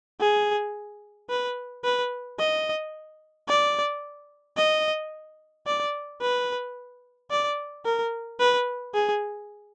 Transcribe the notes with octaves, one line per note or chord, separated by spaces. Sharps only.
G#4
B4
B4
D#5
D5
D#5
D5
B4
D5
A#4
B4
G#4